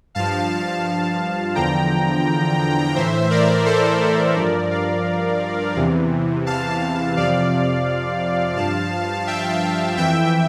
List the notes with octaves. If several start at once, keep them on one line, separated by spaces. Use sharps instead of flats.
G2 F3 F5 A5
E2 D3 F3 G5 A#5
A2 E3 C5 E5
A#4 D5
A4 C5
A4 C5
G2 F3 A#4 D5
D5 F5
E2 C3 E3
F5 A5
F2 C3 F3 D5 F5
G2 F3 F5 A5
E5 G5
F2 E3 E5 G5